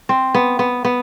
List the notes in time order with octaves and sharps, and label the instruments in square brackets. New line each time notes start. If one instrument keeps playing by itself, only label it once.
[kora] C4
B3
B3
B3